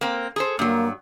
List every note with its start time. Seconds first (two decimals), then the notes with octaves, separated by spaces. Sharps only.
0.01 A#3 C4
0.36 G#4 A4 C5
0.59 G2 F#3 A#3